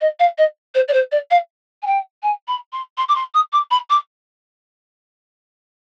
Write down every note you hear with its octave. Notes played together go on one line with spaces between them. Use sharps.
D#5
F5
D#5
C5
D5
C5
D5
F5
G#5
G5
G#5
B5
C6
C6
D6
C6
D#6
D6
B5
D6